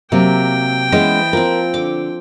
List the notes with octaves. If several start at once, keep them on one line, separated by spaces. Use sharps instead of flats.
C3 F#3 A#3 C4 G5
E3 G#3 B3 C#4 C5 D#5
F3 C4 A#4
D3 D6